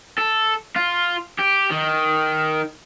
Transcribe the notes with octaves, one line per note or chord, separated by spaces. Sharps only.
A4
F4
G4
D#3